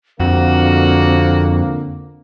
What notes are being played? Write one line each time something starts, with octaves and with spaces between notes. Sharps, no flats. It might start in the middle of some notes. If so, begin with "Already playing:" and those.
F2 D3 A#3 C4 F#4